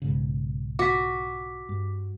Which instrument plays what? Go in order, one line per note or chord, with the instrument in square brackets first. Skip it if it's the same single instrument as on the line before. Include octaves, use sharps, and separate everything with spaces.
[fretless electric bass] B1 G#2 C#3
[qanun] F#4 [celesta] D6 B6
[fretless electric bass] G2